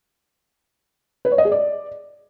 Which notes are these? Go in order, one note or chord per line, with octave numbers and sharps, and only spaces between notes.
B4
C#5
D#5
G#4
D5